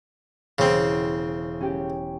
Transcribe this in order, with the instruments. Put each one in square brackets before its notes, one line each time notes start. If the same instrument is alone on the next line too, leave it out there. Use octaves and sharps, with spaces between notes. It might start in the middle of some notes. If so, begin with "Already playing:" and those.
[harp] E1 [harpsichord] C#3 C4
[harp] C#4 G4